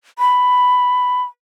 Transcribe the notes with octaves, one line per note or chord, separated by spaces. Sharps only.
B5